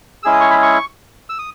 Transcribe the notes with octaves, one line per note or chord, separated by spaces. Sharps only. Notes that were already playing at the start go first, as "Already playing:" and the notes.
G#3 C#4 E4 G#4 E6
D#6
C#6
B5
C#6
E6
D#6